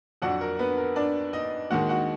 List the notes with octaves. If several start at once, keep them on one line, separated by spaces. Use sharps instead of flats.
F2 D3 F#3 D4 F#4 F#5
A#4
B3 B4
A#4
D4 D5
D#4 D#5
D#2 D#3 G#3 F#4 F#5
F#4 F#5